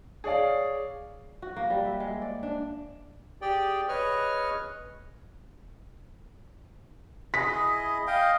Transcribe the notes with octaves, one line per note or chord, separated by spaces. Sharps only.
G#4 C#5 D5 F5
F#4
A#3
G3
E5
G#3
D5
D4
G4 G#4 D5 G5
G#4 B4 C#5 D#5 C#6 F6
E4 G#4 D#5 B6
D#5 F5 G5